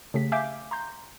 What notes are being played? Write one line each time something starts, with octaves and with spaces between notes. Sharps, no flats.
C#3 A3 G4 B6
E5 F5 G#5 D6 G6 B6
A#5 C6 G6